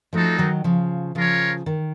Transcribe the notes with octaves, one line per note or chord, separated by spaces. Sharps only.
F3 A3 C4 D#4 F#4 A4
D#3 F#3
C#3 F3
C#3 F3 F4 A#4 C#5
D#3